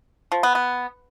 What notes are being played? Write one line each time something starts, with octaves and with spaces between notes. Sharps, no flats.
F3
B3
B3